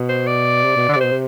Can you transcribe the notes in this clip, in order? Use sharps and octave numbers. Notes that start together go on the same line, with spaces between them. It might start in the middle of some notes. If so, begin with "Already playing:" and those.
Already playing: B2
C5
D5
C3
B2
D3
C3 D5
B2 C5
C3